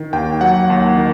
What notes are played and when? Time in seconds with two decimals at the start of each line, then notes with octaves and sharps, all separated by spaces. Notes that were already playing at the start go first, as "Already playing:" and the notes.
Already playing: D#3
0.13 D#2 G5
0.41 F#3 F#5
0.70 D#2
0.97 D#3